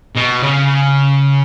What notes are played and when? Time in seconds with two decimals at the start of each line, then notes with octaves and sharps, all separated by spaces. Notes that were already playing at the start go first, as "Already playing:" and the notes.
0.16 B2
0.43 C#3